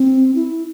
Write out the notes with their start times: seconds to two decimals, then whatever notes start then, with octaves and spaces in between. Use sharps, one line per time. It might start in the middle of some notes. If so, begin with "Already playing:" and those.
Already playing: C4
0.35 E4